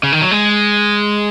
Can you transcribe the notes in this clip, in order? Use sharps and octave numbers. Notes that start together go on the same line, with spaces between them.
C#3
D#3
F#3
G#3